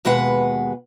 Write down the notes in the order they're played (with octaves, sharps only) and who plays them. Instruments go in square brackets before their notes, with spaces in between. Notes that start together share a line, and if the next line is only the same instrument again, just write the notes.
[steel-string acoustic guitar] D#2 B2 G#3 B4 F#5